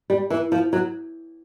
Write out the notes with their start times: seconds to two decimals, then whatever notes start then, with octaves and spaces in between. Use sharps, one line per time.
0.10 G3
0.30 E3
0.52 F3
0.73 F#3